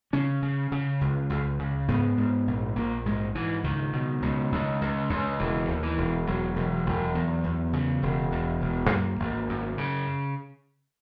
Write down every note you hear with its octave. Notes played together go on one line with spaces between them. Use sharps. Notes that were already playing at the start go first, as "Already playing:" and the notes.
C#3 C#4
C#3
C#3
C#2
C#2
C#3
G#2 B3
G#2
A#1
A#1 A#3
G#2 G#3
G#2 E3
C#2 D#3
B2
C#2
C#2
C#2
C#2
E1 E3
D#2
E3
E1
E1 F#3
E1
E1
E2
E2
C#3
E1
E2
E1
F#2 A#3
G#1
F#2
C#3